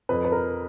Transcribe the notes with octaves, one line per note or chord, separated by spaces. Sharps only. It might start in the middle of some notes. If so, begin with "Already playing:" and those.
F2 B4
B4
A#4